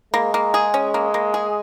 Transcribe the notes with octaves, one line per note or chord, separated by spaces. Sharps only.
G#3 A#3
A#3
G#4
C#4
A#3
A#3
G#4